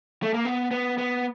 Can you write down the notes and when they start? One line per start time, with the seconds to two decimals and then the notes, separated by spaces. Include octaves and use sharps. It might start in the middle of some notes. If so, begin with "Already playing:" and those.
0.23 A3
0.34 A#3
0.45 B3
0.71 B3
0.98 B3